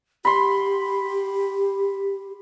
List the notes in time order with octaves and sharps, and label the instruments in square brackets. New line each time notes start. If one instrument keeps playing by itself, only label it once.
[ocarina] G4 [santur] B5 C6